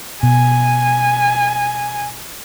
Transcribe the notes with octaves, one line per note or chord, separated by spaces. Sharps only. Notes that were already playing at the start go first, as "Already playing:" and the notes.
B2 G#5